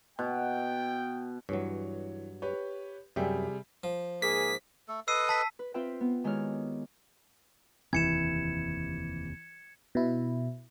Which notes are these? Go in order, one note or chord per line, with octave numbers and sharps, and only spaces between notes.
B2 G5
G2 E3 F#3 C#5
G4 B4 C#5
F#2 C3 G3 G#4 E5 G5
F3
G#2 A#3 G#4 B6
A3 A4
A4 B4 D#5 E6 C7 D#7
A5 B6
B4
C4 F4 B4 C5 E5 G5
B3
D#3 G#3 E4 G4 C#5 F6
F1 D#2 C3 E3 G#6 C#7 E7
B2 E4